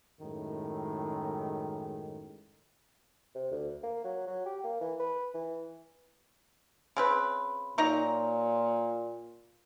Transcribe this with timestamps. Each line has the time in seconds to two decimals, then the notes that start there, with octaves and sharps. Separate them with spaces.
0.21 F#2 A2 D#3 G#3
3.35 C3
3.51 D2
3.83 A#3
4.04 F#3
4.27 F#3
4.46 G4
4.64 A#3
4.81 E3
5.00 B4
5.34 E3
6.97 C#3 C4 B4
7.78 A#2 F#3 D#4 A#5